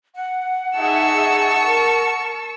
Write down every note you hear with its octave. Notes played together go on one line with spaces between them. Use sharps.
F#5
D#4 G#4 E5 A5 C#6 E6
A#4